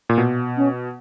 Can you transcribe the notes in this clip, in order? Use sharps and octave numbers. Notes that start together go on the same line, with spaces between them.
A#2
B2
C#4